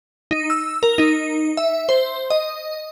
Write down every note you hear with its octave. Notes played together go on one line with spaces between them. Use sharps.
D#4
E6
A#4
D#4
E5
C5
D#5